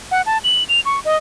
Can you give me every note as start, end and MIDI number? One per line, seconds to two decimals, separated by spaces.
0.11 0.22 78
0.26 0.38 81
0.44 0.64 102
0.69 0.80 101
0.85 1.00 85
1.05 1.16 75